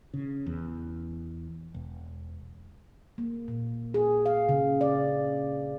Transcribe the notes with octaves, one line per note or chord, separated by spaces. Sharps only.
C#3
E2
E1
A#3
A#2
G#4
F5
C#3
D5